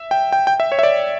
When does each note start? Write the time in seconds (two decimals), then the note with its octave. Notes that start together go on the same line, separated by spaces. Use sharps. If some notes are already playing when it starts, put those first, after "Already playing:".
Already playing: E5
0.11 G5
0.32 G5
0.47 G5
0.60 E5
0.72 C#5
0.79 E5
0.83 D5